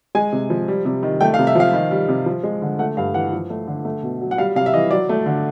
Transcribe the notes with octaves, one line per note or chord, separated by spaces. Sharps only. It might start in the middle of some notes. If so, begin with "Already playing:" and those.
G#3 G#5
C3
F3
G3
C3
D#3
A3 G5
F5
C3
E5
F3 F5
D#3
G3
C3
F3
G#3
D3
A3 F#5
G2 F5
E3 F#5
F3
A3
D3
A3
B2
F#3
F#5
G3 F5
C3 F5
E5
E3 D#5
F#3 D5
A3
D3